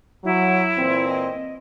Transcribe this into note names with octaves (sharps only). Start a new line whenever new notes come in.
F#3 E4
A#2 E3 C4
D#5